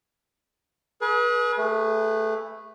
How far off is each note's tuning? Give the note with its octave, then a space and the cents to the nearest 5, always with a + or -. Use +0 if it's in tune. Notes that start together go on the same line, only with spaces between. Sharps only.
G#4 +30 B4 -35
A3 +0 G#4 -30 B4 +0